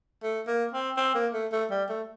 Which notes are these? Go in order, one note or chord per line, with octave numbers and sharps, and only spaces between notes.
A3
A#3
C4
C4
A#3
A3
A3
G3
A3